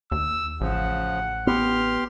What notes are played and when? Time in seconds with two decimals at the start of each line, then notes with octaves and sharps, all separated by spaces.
0.12 D#2 E6
0.61 A1 C#3 F3 F#5
1.47 B3 G4 C6 F6